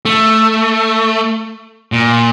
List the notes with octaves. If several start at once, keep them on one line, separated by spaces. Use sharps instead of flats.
A3
A#2